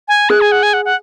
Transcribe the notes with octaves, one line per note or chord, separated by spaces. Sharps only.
G#5
G#4 F#6
G#5
F#5
G#5
F#5
F#5